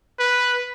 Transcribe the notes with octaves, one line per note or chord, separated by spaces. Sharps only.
B4